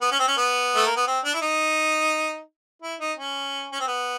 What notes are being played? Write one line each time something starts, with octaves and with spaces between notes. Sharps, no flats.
B3
C#4
C4
C#4
B3
A3
A#3
B3
C4
D4
E4
D#4
E4
D#4
C#4
C#4
C4
B3